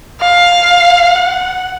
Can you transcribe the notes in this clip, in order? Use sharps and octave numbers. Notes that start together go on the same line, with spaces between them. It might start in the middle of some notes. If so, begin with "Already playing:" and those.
F5
F#5